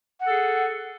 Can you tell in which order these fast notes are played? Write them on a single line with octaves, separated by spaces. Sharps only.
F#5 A4 G#4